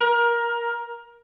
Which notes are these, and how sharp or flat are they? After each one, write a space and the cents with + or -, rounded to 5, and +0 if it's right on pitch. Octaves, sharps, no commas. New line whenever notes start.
A#4 +20